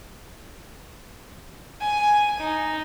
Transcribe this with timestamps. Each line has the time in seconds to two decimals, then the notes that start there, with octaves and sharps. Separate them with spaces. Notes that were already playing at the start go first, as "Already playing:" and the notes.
1.81 G#5
2.40 D#4